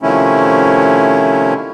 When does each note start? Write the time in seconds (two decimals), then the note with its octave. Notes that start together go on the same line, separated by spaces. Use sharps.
0.03 C3 D#3 F3 A3 C#4 E4